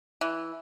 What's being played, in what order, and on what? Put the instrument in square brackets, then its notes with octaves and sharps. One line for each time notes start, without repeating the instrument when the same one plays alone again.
[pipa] E3